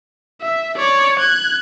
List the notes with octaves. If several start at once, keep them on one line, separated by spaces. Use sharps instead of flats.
E5
C#5 D5
F#6 G#6